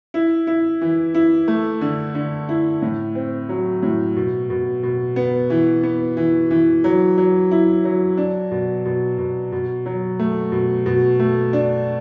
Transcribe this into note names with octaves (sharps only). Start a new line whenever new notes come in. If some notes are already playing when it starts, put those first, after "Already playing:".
E4
E4
E3
E4
A3
D3
D3
E4
A2
C4
F#3
A2
B2
B2
B2
B3
E3
B3
E3
E3
F#3
F#3
E4
F#3
D4
B2
B2
B2
B2
F#3
A3
B2
B2
A3
D4